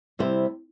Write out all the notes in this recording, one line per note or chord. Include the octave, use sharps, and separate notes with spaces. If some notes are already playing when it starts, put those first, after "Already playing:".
C3 G3 E4 C5